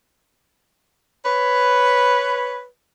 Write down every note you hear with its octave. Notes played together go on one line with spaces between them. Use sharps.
B4 C#5